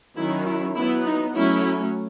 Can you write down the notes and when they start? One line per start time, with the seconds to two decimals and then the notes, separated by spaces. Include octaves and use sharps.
0.16 D#3 F#3 C#4 E4
0.46 E4
0.76 F#3 B3 E4
1.05 D#4
1.35 F#3 A3 C#4 E4